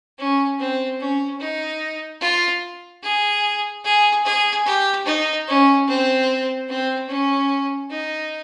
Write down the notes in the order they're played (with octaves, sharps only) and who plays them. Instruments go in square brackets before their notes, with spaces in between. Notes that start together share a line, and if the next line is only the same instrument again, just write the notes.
[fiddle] C#4
C4
C#4
D#4
F4
G#4
G#4
G#4
G4
D#4
C#4
C4
C4
C#4
D#4